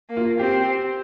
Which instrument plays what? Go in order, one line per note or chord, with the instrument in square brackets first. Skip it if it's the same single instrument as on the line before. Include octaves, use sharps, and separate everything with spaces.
[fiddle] A#3
[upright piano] F4
[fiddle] C4 [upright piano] G4